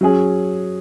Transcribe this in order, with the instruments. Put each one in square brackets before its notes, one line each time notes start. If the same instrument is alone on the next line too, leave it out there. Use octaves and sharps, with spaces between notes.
[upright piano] F#3 C#4 G#4